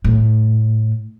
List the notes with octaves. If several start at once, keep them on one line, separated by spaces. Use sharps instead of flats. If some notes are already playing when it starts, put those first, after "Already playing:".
A2